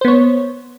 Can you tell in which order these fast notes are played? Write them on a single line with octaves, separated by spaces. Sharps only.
C5 B3 C#5